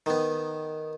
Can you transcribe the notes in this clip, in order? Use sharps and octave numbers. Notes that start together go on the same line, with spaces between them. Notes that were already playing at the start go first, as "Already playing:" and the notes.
D#3 B3